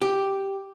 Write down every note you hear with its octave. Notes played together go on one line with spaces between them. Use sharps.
G4